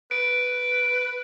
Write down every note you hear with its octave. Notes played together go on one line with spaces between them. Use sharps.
B4 D7